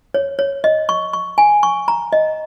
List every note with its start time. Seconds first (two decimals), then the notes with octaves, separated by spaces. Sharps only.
0.14 C#5
0.39 C#5
0.64 D#5
0.89 C#6
1.13 C#6
1.38 G#5
1.63 C#6
1.88 A#5
2.13 D#5